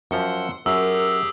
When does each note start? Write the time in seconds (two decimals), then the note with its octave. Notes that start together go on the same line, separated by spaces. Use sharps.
0.11 F#2 F3 F#5 C6 E6
0.66 F#2 G4 G#4 A#4 E6